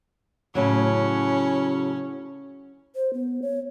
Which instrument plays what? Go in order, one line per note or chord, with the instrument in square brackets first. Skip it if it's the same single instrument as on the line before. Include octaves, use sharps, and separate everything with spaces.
[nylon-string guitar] A2 C#3 F#3 [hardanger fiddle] C#4
[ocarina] C5
B3
C#5